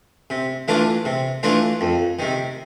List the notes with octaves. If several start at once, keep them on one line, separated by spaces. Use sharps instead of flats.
C3
E3 A3 D4 F4
C3
E3 A3 D4 F4
F2
C3 D#3